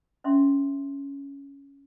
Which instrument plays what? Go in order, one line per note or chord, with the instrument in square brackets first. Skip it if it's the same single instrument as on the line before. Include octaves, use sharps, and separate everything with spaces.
[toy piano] C#4 D4 E5 C6 C#6